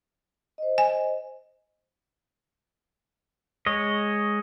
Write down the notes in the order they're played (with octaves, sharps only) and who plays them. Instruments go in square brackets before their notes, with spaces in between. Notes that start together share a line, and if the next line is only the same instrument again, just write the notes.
[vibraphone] C5 D#5
[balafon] G#5
[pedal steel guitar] G#3 C#5 D#5